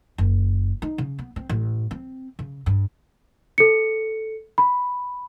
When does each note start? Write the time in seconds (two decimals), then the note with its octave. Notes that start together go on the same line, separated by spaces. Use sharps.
0.18 F#1
0.82 D#4
0.98 C#3
1.19 B3
1.36 C4
1.49 A1
1.91 C4
2.39 C#3
2.66 G2
3.58 A4 C#7
4.58 B5